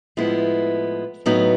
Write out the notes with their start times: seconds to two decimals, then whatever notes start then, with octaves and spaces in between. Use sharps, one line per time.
0.17 A2 F3 G#3 B3 E4
1.26 A2 F#3 B3 D#4